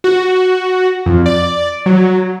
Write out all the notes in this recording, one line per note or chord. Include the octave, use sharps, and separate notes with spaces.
F#4
F2
D5
F#3